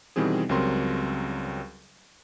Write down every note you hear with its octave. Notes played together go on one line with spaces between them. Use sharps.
B2 D#3 E3 G3 C4 G#4
C#2 F#3 G3 C4 A#4 C6